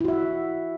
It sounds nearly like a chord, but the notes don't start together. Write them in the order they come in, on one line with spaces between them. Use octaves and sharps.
E4 F#4 E5